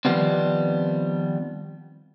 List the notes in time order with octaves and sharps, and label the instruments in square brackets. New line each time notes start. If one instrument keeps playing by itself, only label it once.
[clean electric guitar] D#3 F3 G3 B3 C4